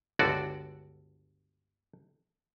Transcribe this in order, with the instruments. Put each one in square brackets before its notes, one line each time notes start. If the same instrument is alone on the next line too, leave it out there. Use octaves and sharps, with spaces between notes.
[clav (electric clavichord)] G1 C#2 D3 F#4 D5